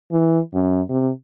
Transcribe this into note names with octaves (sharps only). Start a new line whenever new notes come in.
E3
F#2
C3